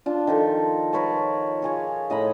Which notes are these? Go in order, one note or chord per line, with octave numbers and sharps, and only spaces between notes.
D4 F4
D#3 F3 A4
A#4 B4 C#5 A5
F4 G#4 C#5
A2 D#5 A#5 B5